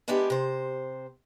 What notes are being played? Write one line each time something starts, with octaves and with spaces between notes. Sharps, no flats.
G#3 B3 D4 E4 G4
C3 C5